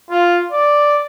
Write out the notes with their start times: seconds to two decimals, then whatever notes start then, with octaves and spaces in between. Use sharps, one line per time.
0.10 F4
0.52 D5